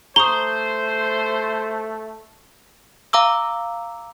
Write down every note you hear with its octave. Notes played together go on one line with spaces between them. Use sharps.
A3 C5 A#5 C#6 D#6 G7
F5 A#5 D6 E6